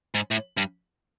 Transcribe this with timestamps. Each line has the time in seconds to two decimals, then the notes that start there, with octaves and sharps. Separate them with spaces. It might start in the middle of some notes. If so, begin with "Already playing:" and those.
0.15 G#2
0.31 A2
0.57 G2